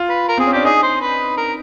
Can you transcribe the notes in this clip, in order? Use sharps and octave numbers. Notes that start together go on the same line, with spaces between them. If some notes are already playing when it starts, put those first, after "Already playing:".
Already playing: F4
B4
A#4
C4 G#4
C#4
D4 G4
D#4 G#4
C5
B4
A#4